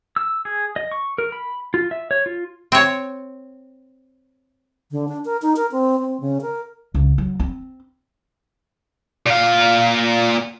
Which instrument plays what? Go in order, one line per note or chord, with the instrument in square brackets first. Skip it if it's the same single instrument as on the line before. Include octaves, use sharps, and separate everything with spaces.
[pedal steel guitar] E6
G#4
D#5
C#6
A#4
B5
F4
E5
C#5
F4
[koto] C4 C#5
[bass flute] D3
D4
A#4
D#4
A#4
C4
C4
C#3
A#4
[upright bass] C#2
F#3
C4
[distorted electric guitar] A#2 F5